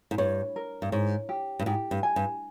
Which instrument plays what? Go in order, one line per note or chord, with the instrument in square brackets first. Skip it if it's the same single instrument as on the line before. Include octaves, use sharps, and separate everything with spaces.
[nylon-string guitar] G#2
[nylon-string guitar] G2 [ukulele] C#5
[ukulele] A#4
[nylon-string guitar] G2
[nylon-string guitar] G#2 [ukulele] C#5
[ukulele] G4
[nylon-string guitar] G2
[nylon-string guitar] G#2 [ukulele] G4
[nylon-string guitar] G2
[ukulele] G#5
[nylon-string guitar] G2